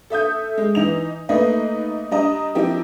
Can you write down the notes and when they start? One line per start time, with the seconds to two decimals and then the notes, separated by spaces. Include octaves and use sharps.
0.10 A4 E5 D#6 G6
0.58 G#3
0.75 E3 D#4 F7
1.29 A3 A#3 D#4 B4 D#5
2.11 G3 D4 D#5 A#5
2.55 F3 C4 D#4 E4 G4 A#4